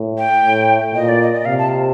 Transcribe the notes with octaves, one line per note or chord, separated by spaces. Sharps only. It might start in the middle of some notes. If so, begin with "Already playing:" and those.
Already playing: A2
G5
A2
A#2 D#5
D5
D#5
D#5
C3 F5
A5